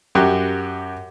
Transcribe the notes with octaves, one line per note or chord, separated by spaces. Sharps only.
F#2 F#4 G4 F#5